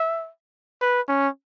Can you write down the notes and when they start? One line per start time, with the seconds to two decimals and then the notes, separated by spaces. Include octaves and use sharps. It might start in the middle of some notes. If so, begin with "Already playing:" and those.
Already playing: E5
0.81 B4
1.09 C#4